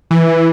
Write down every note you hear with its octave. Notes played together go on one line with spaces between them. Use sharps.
E3